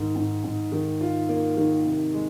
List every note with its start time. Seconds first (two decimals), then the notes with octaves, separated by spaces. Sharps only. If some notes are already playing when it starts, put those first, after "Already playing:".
Already playing: G#2 D#3
0.16 G#2
0.44 G#2
0.72 D#3
1.01 F4
1.29 A#3
1.57 D#3
1.85 C3
2.14 G#3